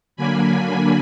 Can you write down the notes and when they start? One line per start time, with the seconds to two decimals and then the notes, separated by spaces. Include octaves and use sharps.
0.16 D3 F#3 A#3 D4 G#5 B5